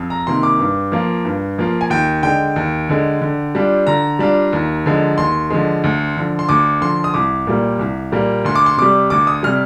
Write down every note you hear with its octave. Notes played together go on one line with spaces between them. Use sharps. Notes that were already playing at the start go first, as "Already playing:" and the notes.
Already playing: F2
A#5
C3 D#3 A#3 C6
D6
G2
F3 A#3 F4
G2
F3 A#3 F4
G#5
D#2 G5
D3 G#3 G5
D#2
D3 G#3
D3
G3 D4 F4
D3 A#5
G3 D4 F4
D#2
D3 F3 G#3
D#2 C6
D3 F3 G#3
D2
D3 F3
C6
D2 D6
D3 F3 C6
D#6
C2 D6
A#2 G3 A#3
C2
A#2 G3 A#3
D2 C6
D6
C6
C3 G3 D6
D2 D6
D#6
C3 G3 F6